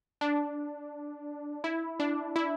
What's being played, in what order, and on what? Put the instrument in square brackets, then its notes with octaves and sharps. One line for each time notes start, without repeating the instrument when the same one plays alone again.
[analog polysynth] D4
E4
D4
E4